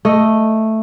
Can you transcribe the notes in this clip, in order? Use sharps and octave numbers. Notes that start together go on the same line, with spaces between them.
A3 D#5